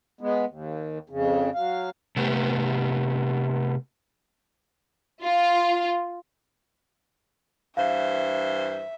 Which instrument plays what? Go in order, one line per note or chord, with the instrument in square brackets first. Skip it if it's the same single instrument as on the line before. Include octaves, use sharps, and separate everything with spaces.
[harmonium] G#3 B3
D#2
F2 C#3
F#3 F5
[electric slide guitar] C3 A3 B3 G4
[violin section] F4
[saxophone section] G2 E3 C5 [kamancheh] E5 [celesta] F5